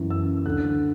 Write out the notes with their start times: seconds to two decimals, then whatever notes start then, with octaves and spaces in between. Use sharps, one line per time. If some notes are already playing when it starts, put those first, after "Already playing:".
Already playing: F#2 E3
0.10 E6
0.45 D2 D3 F#6